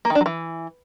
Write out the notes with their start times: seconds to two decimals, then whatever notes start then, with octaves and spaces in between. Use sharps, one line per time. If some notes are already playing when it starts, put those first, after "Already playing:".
0.05 A#3
0.10 D#3
0.15 D4
0.21 F#3
0.26 E3